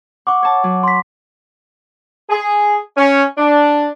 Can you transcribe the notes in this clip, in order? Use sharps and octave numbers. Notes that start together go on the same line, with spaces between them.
F#5 C#6 D6
C#5 A5
F#3
C6 B6
G#4
C#4
D4